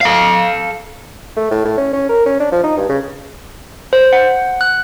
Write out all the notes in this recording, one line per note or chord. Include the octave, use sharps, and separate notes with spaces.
A4 F5
A3
A2
A2
C#4
C#4
A#4
C#4
D4
F3
D#4
G2
C#3
C5
F#5
F#6